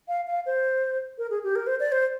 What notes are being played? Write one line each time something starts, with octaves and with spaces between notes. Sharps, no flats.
F5
F5
C5
A#4
G#4
G4
A#4
C5
D5
C5